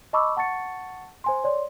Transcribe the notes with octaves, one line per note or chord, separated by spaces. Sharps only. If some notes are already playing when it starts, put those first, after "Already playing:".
D#5 A5 B5 C#6 D6 E6
F#5 A5 C#6 A6 C#7
C5 G#5 C6
C#5 D5 C6